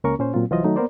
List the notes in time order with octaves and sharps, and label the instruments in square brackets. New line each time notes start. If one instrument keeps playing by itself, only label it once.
[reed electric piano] C#2 A#3 C#4 A#4 C#6
A#2 C#4 C5
A#2 F#3 C4 F4
C2 E3 F#3 F4 C5 D#5
D#3 F#3 A3 D#4
A#3 B3 A#4 C5 D5